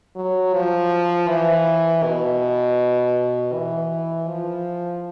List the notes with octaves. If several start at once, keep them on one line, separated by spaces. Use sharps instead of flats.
F#3
F3
E3
B2
E3
F3